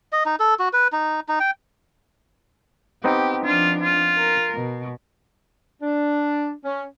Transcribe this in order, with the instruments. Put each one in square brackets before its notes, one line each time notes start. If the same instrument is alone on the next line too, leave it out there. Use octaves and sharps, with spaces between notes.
[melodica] D#5
D#4
A4
F#4
B4
D#4
D#4
G5
[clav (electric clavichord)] B3 C4 D#4 [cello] G4
[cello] F3 D4 [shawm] F4
[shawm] F4
[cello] A#4
B2
[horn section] D4
C#4